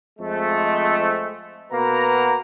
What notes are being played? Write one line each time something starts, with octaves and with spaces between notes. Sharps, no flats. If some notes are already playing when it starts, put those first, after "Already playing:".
F2 G#3 A3
B2 A#3 F#4 B4 F#5 A#5